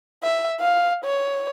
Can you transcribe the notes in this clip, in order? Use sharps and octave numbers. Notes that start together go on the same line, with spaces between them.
E5
F5
C#5